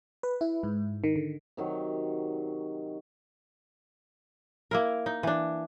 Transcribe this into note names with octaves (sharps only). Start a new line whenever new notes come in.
B4
E4
G#2
D#3
D3
C3 D#3 F#3
A#3 E4 A#4
D#4
E3 D4